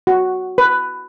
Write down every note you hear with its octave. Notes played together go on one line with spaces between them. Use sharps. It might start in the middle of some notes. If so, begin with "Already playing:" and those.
F#4
B4